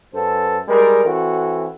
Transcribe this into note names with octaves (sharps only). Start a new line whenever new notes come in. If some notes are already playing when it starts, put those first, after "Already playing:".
F#2 A4 B4 C5
G3 G#3 A#4
E3 C4 F#4 A4